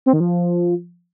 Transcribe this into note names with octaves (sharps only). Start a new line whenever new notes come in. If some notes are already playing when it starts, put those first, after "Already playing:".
C4
D#3
F3